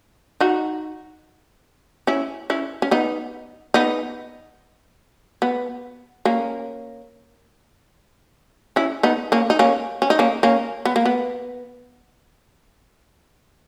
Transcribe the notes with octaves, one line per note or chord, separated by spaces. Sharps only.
D#4 F#4
C#4 E4
C#4 E4
C#4
B3 D#4
B3 D#4
B3
A#3 C#4
C#4 E4
B3 D#4
A#3 C#4
D#4
A#3 C#4
C#4
D#4
A#3 C#4
A#3 C#4
B3
A#3
B3